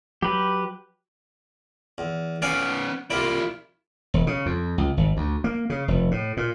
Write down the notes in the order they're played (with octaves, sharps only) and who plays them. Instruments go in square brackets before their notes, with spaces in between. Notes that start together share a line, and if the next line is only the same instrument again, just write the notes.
[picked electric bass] F#3 [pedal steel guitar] G4 B4
[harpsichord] E2
[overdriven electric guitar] B3 C#4 [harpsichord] D5 F5 G#5
[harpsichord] C2 A#3 D5 [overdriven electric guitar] E4 F4
[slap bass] E1
C#3
F2
C#2
G#1
D2
A#3
C#3
F1
A2
A#2